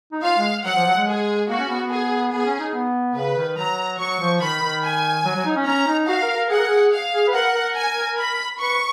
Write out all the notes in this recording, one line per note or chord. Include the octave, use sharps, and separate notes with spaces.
D#4
F4 F5
G#3
F#3 F#5
F3
F#3
G#3
G#4
A#3 F#4
C#4
B3
B3
G#4
B3 G#4
C#4
D#4
B3
C#3 B4
D#3
F#3 A#5
F#3 C#6
F3
D#3 B5
D#3
G#5
F#3
F#3
D#4
C#4
C#4 A#5
D#4
F#4 F5
A#4
A#4
G#4 F#5
A#4
G#4
F5
G#4
B4
A#4 F#5
A#4
G#5
B5
B4 C#6